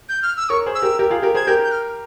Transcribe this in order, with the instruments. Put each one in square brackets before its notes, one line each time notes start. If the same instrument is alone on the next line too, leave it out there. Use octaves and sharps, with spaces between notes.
[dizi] G6
F6
E6
[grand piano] A#4 C#5 [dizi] C#6
[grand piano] G#4 C5
[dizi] E6
[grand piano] G4 A#4
G4 A#4
F4 G#4
G4 A#4
[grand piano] G#4 C5 [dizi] G#6
[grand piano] G4 A#4 [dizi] G6
[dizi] G6
F6